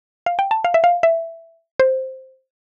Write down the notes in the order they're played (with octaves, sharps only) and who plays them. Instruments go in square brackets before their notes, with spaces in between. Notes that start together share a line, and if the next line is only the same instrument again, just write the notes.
[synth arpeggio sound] F5
G5
A5
F5
E5
F5
E5
C5